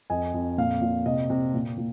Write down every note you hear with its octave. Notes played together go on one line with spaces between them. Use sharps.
F2 D#5 G#5
F2
A#2 F5
A#2
C3 D#5
C3
A#2
A#2